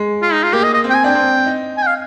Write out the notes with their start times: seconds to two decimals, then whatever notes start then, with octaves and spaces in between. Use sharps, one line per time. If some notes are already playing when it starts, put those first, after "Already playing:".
Already playing: G#3
0.22 F4
0.33 D#4
0.43 F4
0.53 A#3 G4
0.63 D#5
0.74 D#5
0.84 C4
0.90 G5
0.94 G#5
1.04 D4 G5
1.14 C4
1.46 D#4
1.77 G#5
1.83 G5
1.87 F5